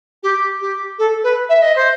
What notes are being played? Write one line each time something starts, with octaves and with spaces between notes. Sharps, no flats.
G4
G4
A4
B4
E5
D#5
C5